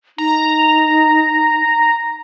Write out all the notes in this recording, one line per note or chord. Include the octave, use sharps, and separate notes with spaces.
D#4 A#5